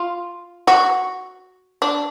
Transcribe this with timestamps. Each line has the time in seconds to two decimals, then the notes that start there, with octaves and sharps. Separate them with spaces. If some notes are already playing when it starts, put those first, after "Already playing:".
Already playing: F4
0.67 F#4
1.82 D4